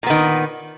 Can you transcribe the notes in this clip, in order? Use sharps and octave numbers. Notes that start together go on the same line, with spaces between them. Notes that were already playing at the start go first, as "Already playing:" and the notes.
A#2 D#3 B3